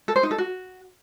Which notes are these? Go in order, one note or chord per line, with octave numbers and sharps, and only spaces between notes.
A4
C5
D#4
A4
F#4